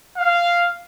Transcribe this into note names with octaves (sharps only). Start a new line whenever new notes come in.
F5